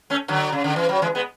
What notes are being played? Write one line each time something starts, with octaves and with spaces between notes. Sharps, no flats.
A3 C#4
D3 F#3
C#3
D3
E3
F#3
E3 G#3
G#3 B3